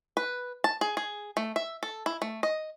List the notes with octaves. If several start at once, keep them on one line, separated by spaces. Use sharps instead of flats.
B4
A5
G#4
G#4
A3
E5
A4
E4
A3
D#5